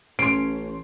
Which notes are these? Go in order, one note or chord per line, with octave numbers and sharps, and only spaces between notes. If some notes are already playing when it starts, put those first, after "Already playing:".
A1 C#4 C6 C7 D7